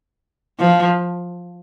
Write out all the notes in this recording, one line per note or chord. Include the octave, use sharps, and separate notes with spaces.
F3